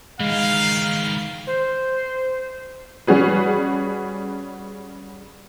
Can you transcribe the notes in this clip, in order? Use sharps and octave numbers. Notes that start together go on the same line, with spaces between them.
D#3 E3 G#3 F5
C5
G3 C#4 F#4 G#4 B4